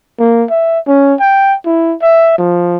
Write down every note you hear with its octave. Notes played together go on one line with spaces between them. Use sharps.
A#3
E5
C#4
G5
E4
E5
F3